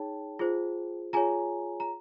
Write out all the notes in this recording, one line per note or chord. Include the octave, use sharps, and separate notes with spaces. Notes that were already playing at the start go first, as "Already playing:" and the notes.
Already playing: D#4 G#4 C#5 G5 A5
F4 G#4 C5
F4 G#4 C#5 G#5 A#5
A#5